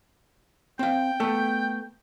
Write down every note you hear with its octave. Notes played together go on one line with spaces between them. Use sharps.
C4 F5 G5
A3 B3 A4